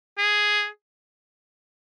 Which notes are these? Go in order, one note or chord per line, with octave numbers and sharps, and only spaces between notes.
G#4